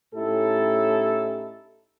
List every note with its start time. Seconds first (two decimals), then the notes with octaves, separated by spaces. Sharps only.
0.15 A2 C#4 D#4 E4 G4 A4